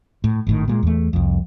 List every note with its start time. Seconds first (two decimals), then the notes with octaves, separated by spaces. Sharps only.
0.24 A2
0.47 G#1 A2 D#3
0.68 A#2 G3 G#3
0.83 E2 A3
1.13 C2 F2